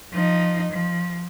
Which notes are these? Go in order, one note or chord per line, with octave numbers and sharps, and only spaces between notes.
F3 D#4
F3